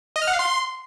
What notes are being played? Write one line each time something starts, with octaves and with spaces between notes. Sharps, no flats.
D#5
F6
F#5
F5
C6